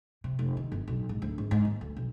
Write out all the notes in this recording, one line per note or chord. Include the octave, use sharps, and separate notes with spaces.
C3
F1
D#3
G1
B1
G#2
D2
G#1
G#2
D#2
D2
B1